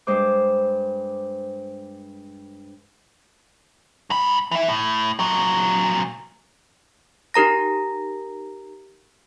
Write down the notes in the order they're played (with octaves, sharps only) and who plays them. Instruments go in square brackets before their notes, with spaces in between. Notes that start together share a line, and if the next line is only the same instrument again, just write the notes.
[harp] G2 G#3 C5 D6
[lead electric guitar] G#2 B5
E3 E5
A2
A#2 F#3
[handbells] D#4 G4 A#4 A#5 A#6